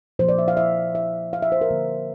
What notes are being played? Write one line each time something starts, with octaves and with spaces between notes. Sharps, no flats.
A#2 F3 A#3 C5
D5
E5
F5
E5
E5
F5
E5
C5
A#4
D3 F3 A#3